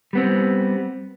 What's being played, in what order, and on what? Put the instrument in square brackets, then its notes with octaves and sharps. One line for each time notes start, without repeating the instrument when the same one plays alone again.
[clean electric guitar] G3 B3 C4